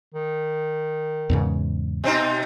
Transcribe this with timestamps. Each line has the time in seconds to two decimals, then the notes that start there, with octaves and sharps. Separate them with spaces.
0.14 D#3
1.30 E2 G#2 C#3
2.04 B2 C4 D#4